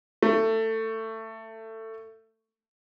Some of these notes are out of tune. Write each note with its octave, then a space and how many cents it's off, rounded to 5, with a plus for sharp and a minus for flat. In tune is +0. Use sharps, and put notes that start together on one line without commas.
A3 +20